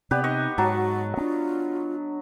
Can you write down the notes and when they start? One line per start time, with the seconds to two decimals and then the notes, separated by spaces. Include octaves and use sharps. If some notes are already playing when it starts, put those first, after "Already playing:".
0.11 C3 B3 G4 B4 D5
0.24 D#4 D#5 C#6
0.58 G#2 F#3 F#4 A5
1.17 C4 D4 F4